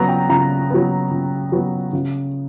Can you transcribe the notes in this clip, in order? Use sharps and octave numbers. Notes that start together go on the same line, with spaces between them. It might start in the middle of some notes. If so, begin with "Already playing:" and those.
Already playing: C#3 F#3 B3 A#5
G5
C#3 A#5
F#3 B3
C#3
F#3 B3
C#3